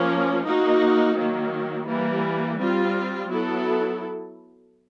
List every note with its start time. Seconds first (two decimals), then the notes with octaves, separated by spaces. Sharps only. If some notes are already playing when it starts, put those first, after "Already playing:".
Already playing: F3 A#3 C#4
0.44 A#3 D#4 F#4
1.16 D#3 F#3 A#3
1.88 E3 G3 A#3
2.59 G3 C4 F4
3.31 F#3 B3 E4 A4